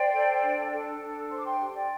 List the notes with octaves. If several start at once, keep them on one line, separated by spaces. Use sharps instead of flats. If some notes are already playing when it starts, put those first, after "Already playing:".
Already playing: C5 D5 G5
A4
D4
A4
D4
C5 C6
D6
G5 C6
G4
D5 G5